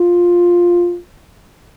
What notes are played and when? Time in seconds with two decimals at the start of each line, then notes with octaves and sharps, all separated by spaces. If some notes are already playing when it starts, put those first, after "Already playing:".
Already playing: F4